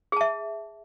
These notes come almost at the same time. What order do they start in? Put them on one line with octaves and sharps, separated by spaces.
G#4 A5 E5